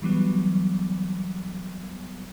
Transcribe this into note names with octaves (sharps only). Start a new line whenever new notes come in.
E3 F#3 G3 B3